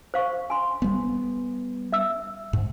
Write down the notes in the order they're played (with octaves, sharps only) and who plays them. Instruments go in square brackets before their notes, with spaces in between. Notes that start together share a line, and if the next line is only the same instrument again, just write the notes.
[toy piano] C5 F5 C#6
G#5 C6
[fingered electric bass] G3 B3
[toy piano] E5 E6
[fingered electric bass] G#2